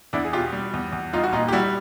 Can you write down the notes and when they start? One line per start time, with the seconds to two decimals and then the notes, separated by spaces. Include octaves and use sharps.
0.13 E2 D4 E4
0.25 G#4
0.33 B2 F4 G4
0.53 G3
0.74 E2
0.93 E2
1.13 G3 D#4 F4
1.24 F#4
1.33 A#2 D#4 F4
1.48 G4
1.52 G3 E4 F#4